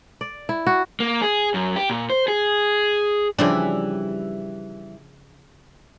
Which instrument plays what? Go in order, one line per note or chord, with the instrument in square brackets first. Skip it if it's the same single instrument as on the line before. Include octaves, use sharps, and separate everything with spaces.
[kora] D5
E4
F#4
[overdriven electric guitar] A#3
G#4
F#2
G4
A#2
C5
G#4
[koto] C#3 F3 D4 [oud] E3 G3